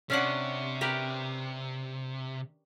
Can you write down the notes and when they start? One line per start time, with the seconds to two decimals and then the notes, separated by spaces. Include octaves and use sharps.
0.10 C3 C#4 D4 F#5
0.81 G4 A#4 B4